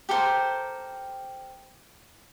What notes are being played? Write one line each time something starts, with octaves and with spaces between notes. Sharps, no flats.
G4 A4 A#4 C5